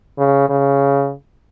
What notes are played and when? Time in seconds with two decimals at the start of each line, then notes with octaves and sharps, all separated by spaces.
0.18 C#3
0.49 C#3